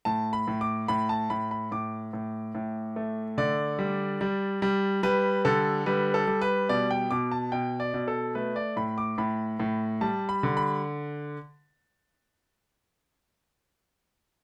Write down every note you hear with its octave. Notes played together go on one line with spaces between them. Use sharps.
A2 A5
B5
A2
D6
A2 B5
A5
A2 B5
B5
A2 D6
A2
A2
A3
D3 D5
G3
G3
G3
G3 B4
D3 A4
G3 B4
A4
G3
B4
B2 D5
G5
B2 D6
A5
B2 G5
D5
B2
A4
A3 B4
D5
A2 B5
D6
A2 B5
A2
G3 A5
B5
D3
B5